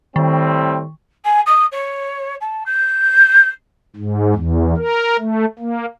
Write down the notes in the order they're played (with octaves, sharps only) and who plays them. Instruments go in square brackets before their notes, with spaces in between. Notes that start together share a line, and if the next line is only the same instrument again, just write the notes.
[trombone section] A2 G3 C4 [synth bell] D#3
[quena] G#5
D#6
C#5
A5
G6
[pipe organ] G#2
E2
A#4
A3
A#3